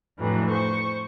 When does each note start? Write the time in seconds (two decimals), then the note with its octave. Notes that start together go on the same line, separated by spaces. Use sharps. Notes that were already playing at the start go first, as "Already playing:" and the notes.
0.18 F2 A2 D3 E3 F#3
0.51 C5 C#6